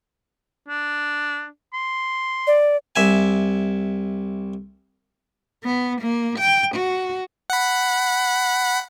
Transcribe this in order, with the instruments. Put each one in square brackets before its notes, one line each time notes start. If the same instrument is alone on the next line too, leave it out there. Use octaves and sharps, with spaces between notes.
[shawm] D4
C6
[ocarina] D5
[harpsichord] C2 E5 G#5
[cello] B3
A#3
G5
F#4
[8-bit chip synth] F#5 B5